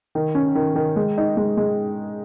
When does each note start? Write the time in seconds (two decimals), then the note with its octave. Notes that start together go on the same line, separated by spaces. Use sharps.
0.15 D#3
0.35 C#4
0.55 D#3
0.76 D#3
0.96 G#3
1.18 D#4
1.37 G#3
1.57 G#3